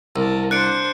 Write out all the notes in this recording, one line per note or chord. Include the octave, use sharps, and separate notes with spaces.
C2 A#4 A5
D4 C5 F#6 C#7 D7